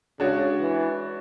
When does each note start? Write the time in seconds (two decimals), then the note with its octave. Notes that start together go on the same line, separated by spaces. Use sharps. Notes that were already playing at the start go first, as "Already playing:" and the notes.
0.20 C#3 G#3 D4 F#4 C#5
0.60 E3